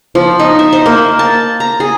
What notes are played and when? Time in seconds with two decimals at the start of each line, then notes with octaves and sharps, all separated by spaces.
0.15 F3
0.39 D#4
0.59 E5
0.72 C5
0.86 A#3
1.19 A5
1.60 A#5
1.80 G#4